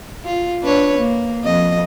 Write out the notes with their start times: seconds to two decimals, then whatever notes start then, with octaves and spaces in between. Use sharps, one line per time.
0.25 F4
0.62 D4 B4 C#5
0.98 A#3
1.44 F2 D#5